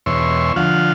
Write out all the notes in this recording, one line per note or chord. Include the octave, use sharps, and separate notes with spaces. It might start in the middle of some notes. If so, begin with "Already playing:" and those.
E2 B2 C#5 E5 C6
D3 F3 F4 F5 F#5